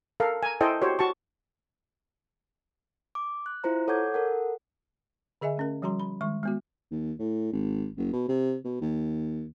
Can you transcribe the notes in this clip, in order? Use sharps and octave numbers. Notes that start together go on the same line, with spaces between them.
A4 A#4 F5
G#5 A#5
E4 A4 C5 D#5 G5 G#5
F#4 G4 C5 C#5
F#4 A5 C#6
D6
F#6
E4 F4 C5 A#5
A4 C#5 F#5 D6 G6 G#6
A4 A#4 F#5
D3 G#4 D#5 E5 G#5
A3 C#4 A#4
F3 G3 F#4 A#5 C6
B5
D#3 G#3 C#6
G#3 B3 F#4
D#2
A2
G#1
F#1
B2
C3
B2
D#2